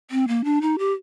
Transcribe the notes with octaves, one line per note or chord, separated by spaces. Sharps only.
C4
A#3
D4
D#4
G4